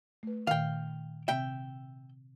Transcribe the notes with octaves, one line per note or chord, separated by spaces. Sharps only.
A3 B4
A#2 D#3 F5 G5
C3 C4 E5 G5